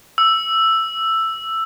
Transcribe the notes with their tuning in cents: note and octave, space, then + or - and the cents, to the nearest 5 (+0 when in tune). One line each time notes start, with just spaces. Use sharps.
E6 +5